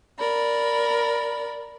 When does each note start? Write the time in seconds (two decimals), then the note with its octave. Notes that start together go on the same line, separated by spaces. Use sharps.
0.18 A#4 D5 B5